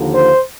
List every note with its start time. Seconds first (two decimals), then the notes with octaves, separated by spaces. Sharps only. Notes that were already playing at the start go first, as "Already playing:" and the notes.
Already playing: D#2 D3 F3
0.12 C5